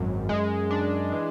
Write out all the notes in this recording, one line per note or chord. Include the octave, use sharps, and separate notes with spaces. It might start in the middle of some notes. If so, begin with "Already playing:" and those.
Already playing: G#1 F#2
G#3
D4
E3